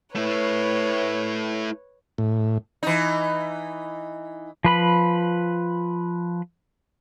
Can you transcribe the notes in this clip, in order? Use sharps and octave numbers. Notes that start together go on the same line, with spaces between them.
A3 E4 B4 C#5
A2
E3 D#4
F3 B4 B5